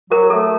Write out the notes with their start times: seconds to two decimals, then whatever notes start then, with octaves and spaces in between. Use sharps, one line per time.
0.10 F#3 A#4
0.30 A3 A4